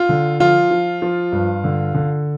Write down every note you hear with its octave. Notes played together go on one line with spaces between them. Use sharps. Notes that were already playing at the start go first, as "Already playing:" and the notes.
Already playing: F4
D3
F3 F4
F3
F3
G2
D3
D3